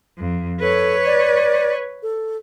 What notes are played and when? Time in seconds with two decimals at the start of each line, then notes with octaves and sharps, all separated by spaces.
0.18 F2
0.60 A4 B4 C#5
1.06 D5
2.03 A4